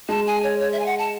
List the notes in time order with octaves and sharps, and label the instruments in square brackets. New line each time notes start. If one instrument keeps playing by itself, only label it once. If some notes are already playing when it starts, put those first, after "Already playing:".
[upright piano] G#3 [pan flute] A5
[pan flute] G#5
C#5
C#5
E5
G#5
F#5
A5